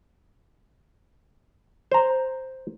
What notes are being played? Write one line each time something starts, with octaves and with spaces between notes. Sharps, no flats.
C5 A#5